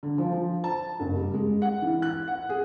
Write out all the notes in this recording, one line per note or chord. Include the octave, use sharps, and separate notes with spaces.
D3
F3
F3
A5
F#1
G3
G#3
F#5
E3
F#6
F#5
G#4